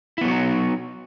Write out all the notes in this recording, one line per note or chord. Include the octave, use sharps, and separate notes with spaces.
F#3 B3 D#4 E4 F#4